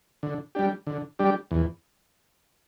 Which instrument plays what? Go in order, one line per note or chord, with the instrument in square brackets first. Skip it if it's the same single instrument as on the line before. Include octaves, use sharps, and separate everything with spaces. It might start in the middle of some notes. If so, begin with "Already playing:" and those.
[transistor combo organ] D3
G3 D4 G4
D3
G3 D4 G4
E2